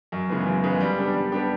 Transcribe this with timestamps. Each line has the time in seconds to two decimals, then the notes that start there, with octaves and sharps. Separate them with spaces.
0.12 F#2
0.29 C#3 E3 G#3 B3
0.47 F#2
0.64 C#3 E3 G#3 B3
0.80 G3
0.98 B3 D4 G4
1.15 G3
1.32 B3 D4 G4